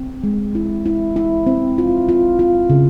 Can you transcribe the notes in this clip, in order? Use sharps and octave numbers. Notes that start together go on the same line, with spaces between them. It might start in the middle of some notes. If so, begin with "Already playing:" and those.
Already playing: C4
G#3
E4
E4
E4
C4
F4
F4
F4
C#3